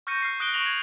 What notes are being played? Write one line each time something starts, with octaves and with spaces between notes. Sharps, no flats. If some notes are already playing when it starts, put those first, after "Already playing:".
C#6 F6 G6 A#6 C#7 D#7
F6 C7 C#7
D#6 F#6 A#6 C#7 D7 G7
C#6 F#6 A#6 D7 F7 F#7
G#6